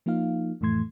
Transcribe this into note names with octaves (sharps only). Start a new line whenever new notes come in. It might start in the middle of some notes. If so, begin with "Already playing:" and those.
F3 A#3 D#4 F4 F5
F2 A2 E3 A3 C6 G#6